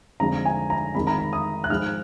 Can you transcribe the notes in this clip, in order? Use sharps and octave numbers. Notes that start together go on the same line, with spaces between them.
F2 D3 F3 G#3 A#5
G#5
A#5
F2 D#3 G#3 B5
A#5
B5
D#6
F#6
G#2 F3 G#3 F6